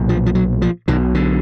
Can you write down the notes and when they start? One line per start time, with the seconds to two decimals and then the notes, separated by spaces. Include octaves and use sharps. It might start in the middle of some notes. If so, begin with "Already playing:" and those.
Already playing: B1 A#2
0.09 F3
0.26 F3
0.35 F#3
0.62 F3
0.88 B1 B2 D#3
1.14 D3